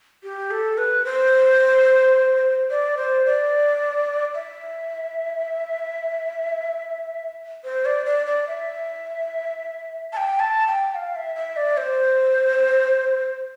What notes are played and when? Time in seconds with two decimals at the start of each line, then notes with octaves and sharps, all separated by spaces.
0.23 G4
0.51 A4
0.78 B4
1.05 C5
2.70 D5
2.97 C5
3.26 D5
4.35 E5
7.64 C5
7.85 D5
8.06 D5
8.26 D5
8.48 E5
10.13 A5
10.17 G5
10.40 A5
10.68 G5
10.95 F5
11.16 E5
11.36 E5
11.56 D5
11.77 C5